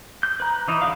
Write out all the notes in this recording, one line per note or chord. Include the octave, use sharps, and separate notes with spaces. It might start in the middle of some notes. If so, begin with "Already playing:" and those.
G6
B4 A#5
E3 D#4 E4
D3 E3 F#3 F5